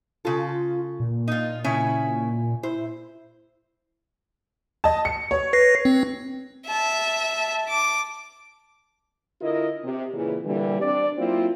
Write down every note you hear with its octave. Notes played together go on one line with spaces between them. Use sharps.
C#3 F4 A4
A#2
D#4 F4
C#3 C#4 E4
E4 C5
D#5 A5
C#7
C#5
B4 A#6 C7
C4
E5 A5
D6
D3 E4 F4 A#4 D#5
C3
A#2 C#3 E3
A#2 D3 E3 G3
C4 D4 D5
F#3 A#3 C4 E4 F4